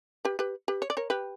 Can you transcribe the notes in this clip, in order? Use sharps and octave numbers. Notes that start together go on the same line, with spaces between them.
G4 B4
G4 B4
G4 B4
C#5
D5
A#4 C#5
G4 B4